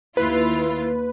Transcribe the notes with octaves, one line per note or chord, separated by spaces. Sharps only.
D#2 E4 F4 B4